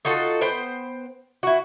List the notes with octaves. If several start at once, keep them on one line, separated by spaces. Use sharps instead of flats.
D#4 F4 F#4 A4
B3 C5 G5
E4 F#4